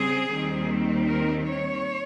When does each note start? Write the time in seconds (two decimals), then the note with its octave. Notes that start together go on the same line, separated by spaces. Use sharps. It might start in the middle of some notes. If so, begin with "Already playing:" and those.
Already playing: C#3 G3 C4 G#4
0.34 D#2 D#3 G3 C4
1.08 A#4
1.45 C#5